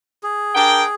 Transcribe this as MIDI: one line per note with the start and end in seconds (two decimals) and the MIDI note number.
0.23 0.95 68
0.55 0.82 62
0.55 0.82 70
0.55 0.82 79